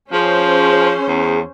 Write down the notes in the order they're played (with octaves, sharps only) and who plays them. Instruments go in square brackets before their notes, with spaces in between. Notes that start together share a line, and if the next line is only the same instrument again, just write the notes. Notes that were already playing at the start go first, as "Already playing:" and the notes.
[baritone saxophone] F3 [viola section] C#4 C5 [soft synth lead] G#4
[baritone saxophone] E2